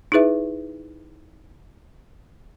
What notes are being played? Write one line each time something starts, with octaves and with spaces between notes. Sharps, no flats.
D#4 E4 G#4 B4 E5